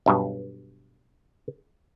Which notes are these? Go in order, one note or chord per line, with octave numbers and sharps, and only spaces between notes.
B1 G2 B2